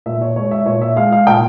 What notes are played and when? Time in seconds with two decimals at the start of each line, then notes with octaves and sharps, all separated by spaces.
0.06 A#2 E5
0.21 C#5
0.36 G#3 C#5
0.51 E5
0.66 A#2 C#5
0.81 E5
0.96 G#3 F5
1.12 F5
1.27 A#2 G5